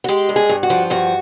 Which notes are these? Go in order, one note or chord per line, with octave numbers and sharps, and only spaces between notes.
F#4
G#3 G4
G2
G#4
G2
F#4
F3
G2 F#4